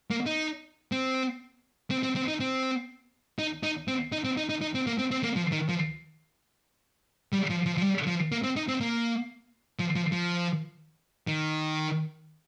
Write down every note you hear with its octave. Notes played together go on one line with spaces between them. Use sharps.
A#3
D#4
C4
C4
C4
C4
D#4
C4
D#4
D#4
C4
D#4
C4
D#4
D#4
D#4
C4
A#3
C4
C4
A#3
F3
D#3
F3
G3
F3
F3
F3
G3
F3
A#3
C4
D#4
C4
A#3
F3
F3
F3
D#3